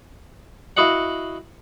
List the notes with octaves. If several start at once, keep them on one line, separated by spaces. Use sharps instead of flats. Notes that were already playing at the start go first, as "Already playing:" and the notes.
E4 F#4 D#5 F5 F#5